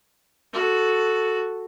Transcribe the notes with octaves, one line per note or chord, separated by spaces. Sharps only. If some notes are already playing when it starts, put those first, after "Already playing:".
F#4 A4